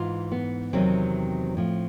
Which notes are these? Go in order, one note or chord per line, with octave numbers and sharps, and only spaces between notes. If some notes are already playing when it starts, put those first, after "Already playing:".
Already playing: G#2 E3 F4
B3
E2 C3 D#3 F#3 C4
A2 F3